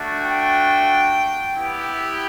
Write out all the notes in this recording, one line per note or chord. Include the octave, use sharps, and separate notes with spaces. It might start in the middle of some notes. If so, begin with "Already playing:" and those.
Already playing: A3 D4 F#4
G5
B3 E4 G4